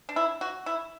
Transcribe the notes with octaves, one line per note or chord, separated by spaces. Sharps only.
D4
E4
F#4
E4